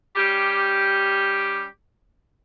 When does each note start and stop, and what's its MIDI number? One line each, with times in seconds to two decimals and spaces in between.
0.16 1.64 55
0.16 1.64 61
0.16 1.64 67